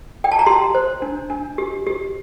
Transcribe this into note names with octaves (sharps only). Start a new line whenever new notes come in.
G5
A5
A#5
G4 C6
C5
D4
D4
G4
G4